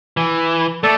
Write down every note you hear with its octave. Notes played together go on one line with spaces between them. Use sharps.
E3
A3 A4 D5